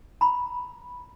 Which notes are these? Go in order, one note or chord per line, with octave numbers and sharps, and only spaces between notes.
A#5 B5